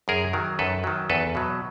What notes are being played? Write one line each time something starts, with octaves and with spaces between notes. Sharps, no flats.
F#2 G#4 A#4
D#3 F#3
F#2 A4 B4
D#3 F#3
E2 A4 B4
B2 F#3